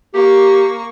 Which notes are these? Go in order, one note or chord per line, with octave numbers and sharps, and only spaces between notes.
A#3 G4 C#6